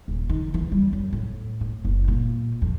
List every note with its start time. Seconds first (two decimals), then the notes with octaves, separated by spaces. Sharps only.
0.08 D#1
0.29 D#3
0.54 E3
0.72 G3
0.93 F#2
1.13 A2
1.61 A2
1.85 F#1
2.08 A#2
2.62 F2